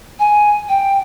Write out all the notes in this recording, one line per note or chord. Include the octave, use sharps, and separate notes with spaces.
G#5
G5